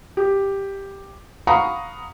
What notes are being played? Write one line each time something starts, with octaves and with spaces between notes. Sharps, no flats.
G4
F5 F#5 A#5 B5 C#6 D#6